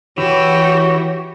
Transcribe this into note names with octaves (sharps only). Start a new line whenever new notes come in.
E3 F#4 G4 C#5